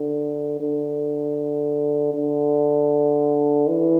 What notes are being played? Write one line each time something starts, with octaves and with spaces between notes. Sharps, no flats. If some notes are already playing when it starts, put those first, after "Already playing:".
Already playing: D3
D3
D3
E3